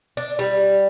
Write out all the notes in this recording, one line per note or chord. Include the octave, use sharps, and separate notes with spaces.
D4
G3